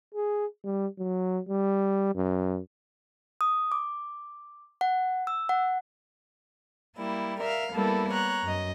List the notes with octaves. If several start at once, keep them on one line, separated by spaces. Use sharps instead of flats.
G#4
G3
F#3
G3
F#2
D#6
D6
F#5
E6
F#5
G3 A#3 E4
A#4 E5 F5
G3 A#3 B3 E4 A4 A#4
C#5 A#5 F#6
F#2 D#5